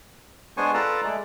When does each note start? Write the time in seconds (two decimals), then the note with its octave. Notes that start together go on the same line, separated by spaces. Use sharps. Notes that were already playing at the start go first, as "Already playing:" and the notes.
0.57 G#3 B3 D4 C5 G#5 C#6
0.74 F4 A4 B4 D5 A5 A#5
1.04 G#3 A3 D5